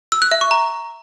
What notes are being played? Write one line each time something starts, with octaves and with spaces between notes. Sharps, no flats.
E6
F#6
E5
C#6
A#5